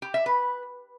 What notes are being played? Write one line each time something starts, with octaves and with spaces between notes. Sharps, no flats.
G4
E5
B4